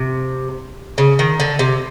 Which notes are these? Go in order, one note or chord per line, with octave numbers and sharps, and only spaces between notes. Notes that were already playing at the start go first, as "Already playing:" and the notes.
Already playing: C3
C#3
D#3
D3
C3